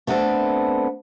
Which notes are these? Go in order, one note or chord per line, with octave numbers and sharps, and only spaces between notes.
A3 B3 C4 D4 A4